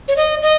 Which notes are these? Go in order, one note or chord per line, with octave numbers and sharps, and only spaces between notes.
C#5
D#5
D#5